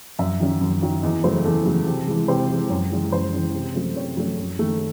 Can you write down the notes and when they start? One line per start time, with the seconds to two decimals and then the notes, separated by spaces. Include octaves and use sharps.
0.19 F#2 E5
0.40 D#3 F#3 C#4
0.61 F#2
0.82 D#3 F#3 C#4
1.02 E2 D#5
1.23 C#3 F#3 A3 C5
1.45 E2 A4
1.65 C#3 F#3 A3
1.86 C3
2.07 E3 G#3
2.28 C3 C5
2.49 E3 G#3
2.70 F#2 C#5
2.91 C#3 E3 G#3 C#4
3.12 F#2 C5
3.33 C#3 E3 G#3 C#4
3.55 C3
3.75 F#3 A3 C#4
3.96 C3 C#5
4.17 F#3 A3 C#4
4.38 F#2
4.59 D#3 A3